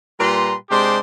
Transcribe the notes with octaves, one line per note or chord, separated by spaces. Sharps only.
A#2 G3 B4 A#5 C6
C3 G#3 D4 G4 C5 C6